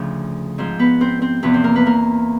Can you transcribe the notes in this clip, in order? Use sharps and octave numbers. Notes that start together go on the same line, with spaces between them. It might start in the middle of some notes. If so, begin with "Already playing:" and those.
Already playing: D2 C#3 F3
G#2 F3 C4 C5
B3 B4
C4 C5
C4 C5
E2 C3 F3 B3 B4
C4 C5
A#3 A#4
B3 B4
A#3 A#4